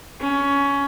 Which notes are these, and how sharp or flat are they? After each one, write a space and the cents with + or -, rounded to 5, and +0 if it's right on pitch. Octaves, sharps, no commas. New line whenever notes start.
C#4 +15